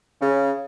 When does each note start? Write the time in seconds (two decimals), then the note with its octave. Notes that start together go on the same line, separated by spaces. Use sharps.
0.20 C#3